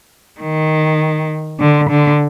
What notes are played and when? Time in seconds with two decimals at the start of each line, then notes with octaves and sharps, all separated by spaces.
0.40 D#3
1.60 D3
1.90 D3